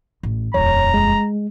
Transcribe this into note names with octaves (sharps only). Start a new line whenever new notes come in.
A1
D#1 F2 C#5 A#5
G#3